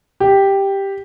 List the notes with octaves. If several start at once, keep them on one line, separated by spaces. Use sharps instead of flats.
G4